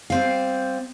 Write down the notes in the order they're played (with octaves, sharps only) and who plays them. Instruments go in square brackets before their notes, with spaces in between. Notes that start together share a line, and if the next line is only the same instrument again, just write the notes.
[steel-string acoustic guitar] G3 C4 F5